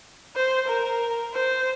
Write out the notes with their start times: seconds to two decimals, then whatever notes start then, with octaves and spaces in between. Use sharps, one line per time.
0.36 C5
0.68 A#4
1.33 C5